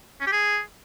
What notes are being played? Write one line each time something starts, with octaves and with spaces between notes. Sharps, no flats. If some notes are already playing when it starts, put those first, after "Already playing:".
C#4
G4
G#4